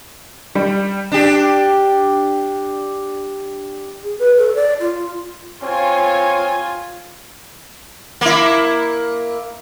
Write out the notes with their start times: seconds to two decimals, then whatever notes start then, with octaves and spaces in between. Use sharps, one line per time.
0.55 G3
1.12 D4 G4
4.03 G#4
4.19 B4
4.37 A4
4.55 D5
4.80 F4
5.63 C4 F4 C#5 G#5
8.21 A#3 E4